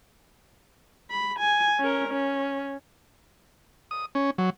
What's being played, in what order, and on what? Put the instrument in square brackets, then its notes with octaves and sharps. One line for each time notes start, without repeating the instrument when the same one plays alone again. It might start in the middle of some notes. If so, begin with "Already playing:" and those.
[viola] B5
G#5
C#4 A#4
C#4
[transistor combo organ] D#6
C#4
F#3